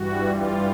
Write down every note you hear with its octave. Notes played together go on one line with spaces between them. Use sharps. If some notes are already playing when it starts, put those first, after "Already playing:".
Already playing: G2 E3 G3 F#4
F4